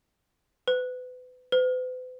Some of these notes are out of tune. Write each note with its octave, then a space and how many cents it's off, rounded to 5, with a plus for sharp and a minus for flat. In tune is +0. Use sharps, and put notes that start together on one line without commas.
B4 +30
B4 +45